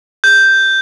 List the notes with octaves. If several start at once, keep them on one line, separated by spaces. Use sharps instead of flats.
G6